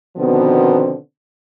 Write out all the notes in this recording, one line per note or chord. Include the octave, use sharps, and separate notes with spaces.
B2 D3 D#3 F3 B3 C4